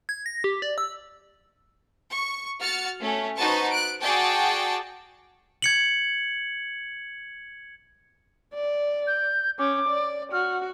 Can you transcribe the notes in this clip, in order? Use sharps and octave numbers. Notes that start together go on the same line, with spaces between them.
G#6
A#6
G4
D5
E6
C#6
F#4 F6 A6 C#7
A3 C#4
D#4 F#4 B4 C5 A5 C#6
F#6 D7
F#4 G#4 D5 G5 A5
G#6 C#7 F#7
D5
G6
C#4 D6
D5
F#4 F6